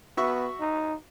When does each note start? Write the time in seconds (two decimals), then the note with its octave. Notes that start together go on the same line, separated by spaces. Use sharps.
0.17 B3 F#4 E5 C#6
0.61 D#4